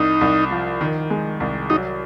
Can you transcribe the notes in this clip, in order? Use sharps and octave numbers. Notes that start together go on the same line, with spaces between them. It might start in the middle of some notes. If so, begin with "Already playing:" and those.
Already playing: C2 D#4
C2
F3
D#3
G#3
C2
F#3 D#4